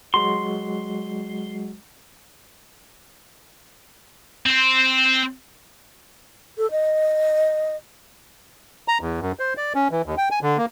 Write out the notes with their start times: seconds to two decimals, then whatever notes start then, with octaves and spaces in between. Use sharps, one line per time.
0.14 F#3 G#3 F#4 C6
4.46 C4 C5
6.58 A4
6.71 D#5
8.88 A#5
9.01 E2
9.20 F#2
9.39 C5
9.57 D5
9.75 C#4
9.91 E3
10.06 D#2
10.18 G5
10.31 G#5
10.42 D3
10.57 A#3